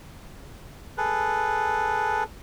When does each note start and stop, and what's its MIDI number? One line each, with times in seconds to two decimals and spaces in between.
0.98 2.24 68
0.98 2.24 69
0.98 2.24 71